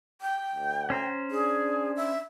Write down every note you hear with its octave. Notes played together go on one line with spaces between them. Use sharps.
G5
D2
C#4 C5 A#5
D4 G#4
E5